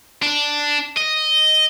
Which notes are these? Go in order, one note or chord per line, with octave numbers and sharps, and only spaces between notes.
D4
D#5